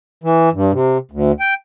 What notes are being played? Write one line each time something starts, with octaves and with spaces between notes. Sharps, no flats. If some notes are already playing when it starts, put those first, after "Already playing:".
E3
G2
C3
D2
G5